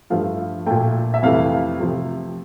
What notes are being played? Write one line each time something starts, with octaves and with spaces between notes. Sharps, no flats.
G2 F3 A3 F5
A#2 A3 G5
E5
F2 C3 E3 A3 F5
C3 F3 A3